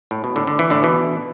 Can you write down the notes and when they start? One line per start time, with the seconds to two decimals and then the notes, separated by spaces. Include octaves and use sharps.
0.11 A2
0.24 B2
0.36 A2 D3
0.47 D3
0.59 E3
0.70 A2 D3
0.83 B2 E3